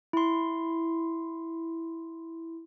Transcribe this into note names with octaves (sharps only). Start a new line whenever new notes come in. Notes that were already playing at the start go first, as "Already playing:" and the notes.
E4 C6